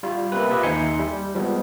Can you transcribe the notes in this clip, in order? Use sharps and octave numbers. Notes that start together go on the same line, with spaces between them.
G3 F4
C3 A#3 C4 B4
F4 G4 B4 C5 D#5 E5
D#2 D#4 E5 G#5 C6 C#7
G3
F3 G3 G#3 B3